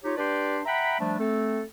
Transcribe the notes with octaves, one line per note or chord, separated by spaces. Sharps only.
D#4 F4 G4 C#5
D4 G4 B4 D5 G5 C6
E5 F#5 G5 A#5 B5
F3 G3 A3 D4
A3 C4 A4